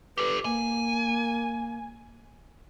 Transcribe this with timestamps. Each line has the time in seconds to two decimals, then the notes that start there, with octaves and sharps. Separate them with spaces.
0.18 G4 A4 B4
0.45 A#3 G#5